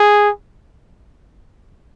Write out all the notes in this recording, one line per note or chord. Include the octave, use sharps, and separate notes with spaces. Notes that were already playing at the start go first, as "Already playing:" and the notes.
Already playing: G#4